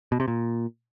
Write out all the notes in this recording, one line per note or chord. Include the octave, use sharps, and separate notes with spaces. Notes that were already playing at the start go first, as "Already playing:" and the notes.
B2
C3
A#2